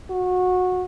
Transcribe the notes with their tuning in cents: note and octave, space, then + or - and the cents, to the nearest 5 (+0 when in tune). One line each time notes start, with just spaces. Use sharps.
F#4 -20